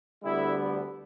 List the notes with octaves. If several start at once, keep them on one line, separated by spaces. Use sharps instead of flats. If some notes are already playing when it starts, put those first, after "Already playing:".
D2 D3 G3 B3 E4